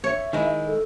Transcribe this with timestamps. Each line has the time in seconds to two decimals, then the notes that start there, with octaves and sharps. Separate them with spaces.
0.04 C#5 E5
0.33 D#3 G#3 E4
0.66 A4